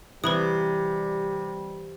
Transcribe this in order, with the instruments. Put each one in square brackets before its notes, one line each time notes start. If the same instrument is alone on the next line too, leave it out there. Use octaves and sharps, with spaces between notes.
[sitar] C3 [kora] E3 [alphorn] G3 [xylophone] B4 B5 D#6